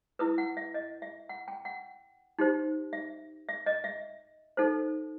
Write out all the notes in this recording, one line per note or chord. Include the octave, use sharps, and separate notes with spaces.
E4 B4 D#6
F#5
E5
D#5
E5
F#5
G5
F#5
D#4 G4 C5
E5
E5
D#5
E5
D#4 A4 C5